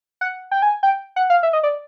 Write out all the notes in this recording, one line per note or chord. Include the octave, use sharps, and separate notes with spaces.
F#5
G5
G#5
G5
F#5
F5
E5
D#5
D5